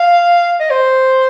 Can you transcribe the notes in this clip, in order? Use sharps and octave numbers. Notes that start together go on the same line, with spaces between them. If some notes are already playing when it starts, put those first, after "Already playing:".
Already playing: F5
D#5
C5